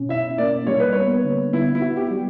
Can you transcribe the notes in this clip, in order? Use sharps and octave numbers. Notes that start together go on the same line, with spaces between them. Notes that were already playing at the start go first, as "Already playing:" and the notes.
Already playing: B2 C#4
E4 E5
A#3 D5
G3 C#5
B4
B3 C#5
D3
B3 E4
E4
F#4
G4
G3